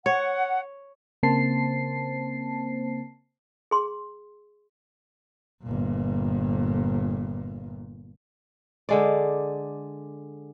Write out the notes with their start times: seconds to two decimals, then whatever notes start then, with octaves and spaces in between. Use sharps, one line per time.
0.06 C#5 F#5
1.23 C#3 A#3 C4 C5 A5 C7
3.71 G#4 C6
5.63 G1 A#2
8.89 D3 G#3 D5